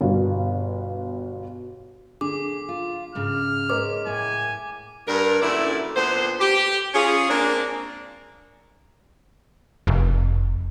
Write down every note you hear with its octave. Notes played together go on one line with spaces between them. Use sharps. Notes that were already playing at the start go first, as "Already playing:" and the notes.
G1 G2 B2
D3 G#4 D6
F4
G#2 C#3 F6
G#3 A#4 C#5 D6
A2 G#5
G2 A#4
F#2 A#2 D3 A3 E4 D5
A#2 D3 B3 C5
G4
C#4 F4 G#4
G#3 A#3 C4 D4
F1